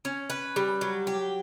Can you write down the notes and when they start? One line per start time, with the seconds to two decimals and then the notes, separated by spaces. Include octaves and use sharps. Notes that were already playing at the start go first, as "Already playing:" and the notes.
0.05 C#4
0.30 B4
0.56 G3
0.81 F#3
1.07 G4